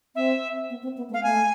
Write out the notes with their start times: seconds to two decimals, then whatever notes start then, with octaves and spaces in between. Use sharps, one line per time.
0.15 C4 E5
0.70 B3
0.83 C4
0.97 B3
1.10 A3
1.14 F5
1.23 A3 G#5